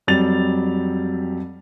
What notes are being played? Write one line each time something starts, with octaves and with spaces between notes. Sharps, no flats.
F2 F#3 G3 A6 F7